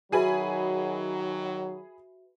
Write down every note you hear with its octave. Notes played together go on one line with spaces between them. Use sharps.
D#3 F#3 F#4 G#4 B4 E5 G#5 B5